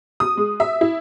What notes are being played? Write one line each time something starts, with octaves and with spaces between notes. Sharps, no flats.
D#6
G#3
E5
E4